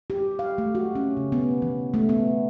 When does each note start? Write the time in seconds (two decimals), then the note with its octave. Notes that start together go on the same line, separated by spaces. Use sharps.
0.10 G4
0.39 F5
0.58 A3
0.75 F#4
0.95 C#4
1.17 C#3
1.32 B3
1.62 E3
1.94 A3
2.09 B3